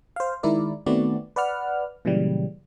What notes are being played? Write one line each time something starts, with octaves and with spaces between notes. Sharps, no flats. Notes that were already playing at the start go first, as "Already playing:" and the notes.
C5 F5
D#3 G#3 E4 A#4 D5
D#3 A3 B3 C4 F#4 D5
B4 D5 F#5 F6
A#2 C#3 E3 F#3 G3